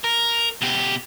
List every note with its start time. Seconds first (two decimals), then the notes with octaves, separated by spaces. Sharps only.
0.04 A#4
0.61 B2 G4